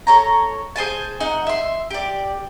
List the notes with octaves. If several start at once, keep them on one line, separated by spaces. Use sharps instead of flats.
A4 C#5 A#5
G#4 C5 G#5 A5
D#4 F#5
E5 C6
G4 D5